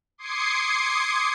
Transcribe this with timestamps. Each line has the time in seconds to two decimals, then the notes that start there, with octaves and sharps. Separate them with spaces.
0.18 C6 D6 D#6 G#6 C7 C#7